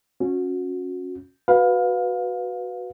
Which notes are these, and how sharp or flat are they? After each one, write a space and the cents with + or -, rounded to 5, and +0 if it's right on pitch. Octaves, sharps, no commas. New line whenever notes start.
C#4 -10 F#4 -30
F#4 +0 B4 +0 F5 +25